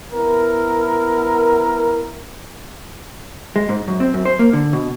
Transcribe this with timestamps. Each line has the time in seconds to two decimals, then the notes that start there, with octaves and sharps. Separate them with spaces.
0.13 B3 E4 A#4
3.56 G#3
3.69 G#2
3.87 F#2
4.00 C4
4.14 F#2
4.25 C5
4.39 A#3
4.53 D3
4.73 B2